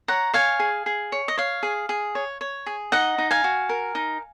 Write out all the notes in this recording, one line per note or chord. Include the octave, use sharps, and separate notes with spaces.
C#5 F#5 A#5
C#5 F5 G#5
G#4
G#4
C#5
D#5
C#5 F5
G#4
G#4
C#5
C#5
G#4
D#4 D#5 F#5
D#4
F5 G#5
F#4
A#4
D#4